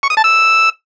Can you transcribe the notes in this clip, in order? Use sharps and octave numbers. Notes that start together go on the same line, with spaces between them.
C#6
D#6
A5
E6